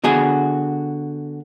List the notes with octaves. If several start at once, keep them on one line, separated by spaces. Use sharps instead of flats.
D3 B3 F#4 G#4 G#5